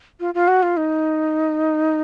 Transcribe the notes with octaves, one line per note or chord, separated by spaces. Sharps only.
F4
F4
F#4
F4
D#4